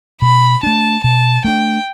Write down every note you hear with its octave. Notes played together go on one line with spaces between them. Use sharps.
B2 B5
A3 D4 A5
B2 A5
A3 D4 G5